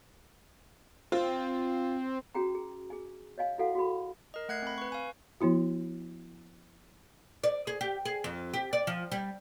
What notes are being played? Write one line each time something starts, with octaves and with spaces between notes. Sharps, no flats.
C4 F4
C#4 F#4 G#4 G5 A#5
G#4
G#4 G#5
C#5 D#5 F5 G#5
E4 F#4 A4 F5 F#5
F#4 G#4 B5
A#4 D#5
A3 F#5 F#6 G#6 C7
C4 B5
B4 C#6
F5 G#5
F3 B3 E4 F#4
D5
G#4
G4
G#4
F2
G4
D5
F3
G3